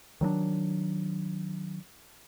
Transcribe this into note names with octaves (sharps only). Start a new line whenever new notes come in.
D#3 F#3 G#3 D4